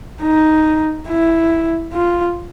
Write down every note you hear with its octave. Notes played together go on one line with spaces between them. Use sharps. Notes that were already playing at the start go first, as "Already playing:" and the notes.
D#4
E4
F4